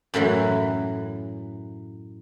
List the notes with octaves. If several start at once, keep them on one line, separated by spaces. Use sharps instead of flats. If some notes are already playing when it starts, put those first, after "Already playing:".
F#2 A2 E3 F#3